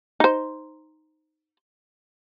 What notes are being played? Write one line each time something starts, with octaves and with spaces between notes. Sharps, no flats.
D#4 C5